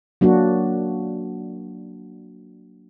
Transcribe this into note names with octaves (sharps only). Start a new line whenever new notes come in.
F#3 A#3 D4 F#4